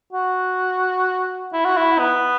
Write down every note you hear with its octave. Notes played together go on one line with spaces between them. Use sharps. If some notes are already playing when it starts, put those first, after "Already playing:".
F#4
E4
F#4
E4
B3